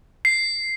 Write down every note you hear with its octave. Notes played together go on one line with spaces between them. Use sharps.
C7